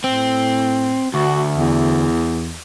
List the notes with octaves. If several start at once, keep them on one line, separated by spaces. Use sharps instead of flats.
A2 C4
D2 F#4
E2